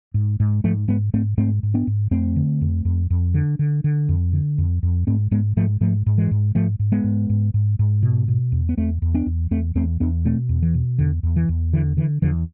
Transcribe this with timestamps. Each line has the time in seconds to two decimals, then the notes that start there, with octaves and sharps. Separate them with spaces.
0.14 G#2
0.40 G#2
0.64 G#2 F3 A3
0.88 G#2 G#3 B3
1.13 G#2 A3 C4
1.38 G#2 A3 C4
1.63 G#2
1.74 B3 D4
1.87 G#2
2.11 F2 A3 C4
2.36 D3
2.61 F2
2.85 F2
3.10 F2
3.34 D3
3.59 D3
3.84 D3
4.09 F2
4.33 D3
4.58 F2
4.83 F2
5.07 G#2 A3 C4
5.31 G#2 G#3 B3
5.57 G#2 F3 A3
5.81 G#2 F3 A3
6.06 G#2
6.18 E3 G#3
6.31 G#2
6.55 G#2 F3 A3
6.79 G#2
6.92 G#3 B3
7.04 G#2
7.30 G#2
7.54 G#2
7.79 G#2
8.03 B2
8.28 B2
8.52 E2
8.69 B3
8.78 E2 A3 C4
9.02 E2
9.14 B3 D4
9.26 E2
9.51 E2 A3 C4
9.75 E2 A3 C4
10.00 E2 B3 D4
10.25 B2 A3 C4
10.49 E2
10.62 E3
10.74 B2
10.98 E2 D3
11.23 E2
11.36 E3
11.49 E2
11.73 D3 E3
11.97 D3 E3
12.22 E2 D3 F3